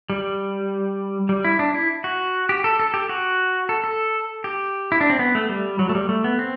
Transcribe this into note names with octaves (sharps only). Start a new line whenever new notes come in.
G3
G3
E4
D4
E4
F#4
G4
A4
A4
G4
F#4
A4
A4
G4
E4
D4
C4
B3
A3
G3
F#3
A3
G3
A3
B3
C4